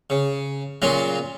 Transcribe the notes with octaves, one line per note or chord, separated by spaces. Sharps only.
C#3
A#2 C#3 F#3 F4